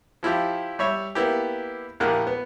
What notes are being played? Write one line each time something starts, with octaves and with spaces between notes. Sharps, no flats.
F3 E4 F4 G4
G3 C#5 E5
A#3 B3 E4 G4
A#1 A#3 E4 G4 F#5 F6
B3